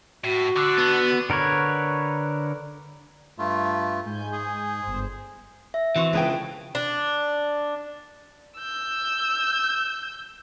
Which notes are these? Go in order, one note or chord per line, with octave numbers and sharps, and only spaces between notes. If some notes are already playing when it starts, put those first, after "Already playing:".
A2 F#4
D3 D4 D6 E6 F#6
B3
D3 A#4 B4 C#5
G2 A3 F4
G#2 G#5 G6
G#4
G1 C5
E5
E3 C4 F#4
C#2 D3 F3 B3 G#4 G5
D4
E6 G6